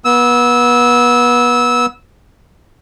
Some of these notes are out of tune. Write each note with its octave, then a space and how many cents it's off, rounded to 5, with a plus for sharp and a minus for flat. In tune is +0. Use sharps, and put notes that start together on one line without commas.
B3 -30 E6 -20